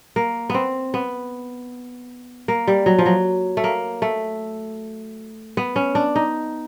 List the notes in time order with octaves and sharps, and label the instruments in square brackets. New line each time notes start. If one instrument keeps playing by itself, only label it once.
[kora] A#3
B3 C4
B3
A#3
G3
F#3
F3
F#3
A3
A#3
A3
B3
C#4
D4
D#4